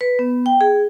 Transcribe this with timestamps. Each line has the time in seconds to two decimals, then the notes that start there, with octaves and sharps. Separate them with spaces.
0.01 B4
0.19 B3
0.46 G5
0.61 G#4